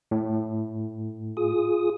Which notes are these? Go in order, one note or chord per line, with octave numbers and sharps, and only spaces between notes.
A2
F4 G#4 D#6